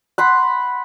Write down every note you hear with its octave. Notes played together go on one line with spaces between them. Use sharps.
F#5 B5 C6